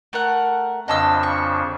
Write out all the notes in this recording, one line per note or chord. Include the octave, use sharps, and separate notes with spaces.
A3 A#4 F#5
F2 C#3 D4 D#5 A5 E6
C#6